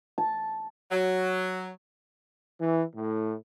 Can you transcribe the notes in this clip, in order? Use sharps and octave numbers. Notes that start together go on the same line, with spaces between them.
A5
F#3
E3
A2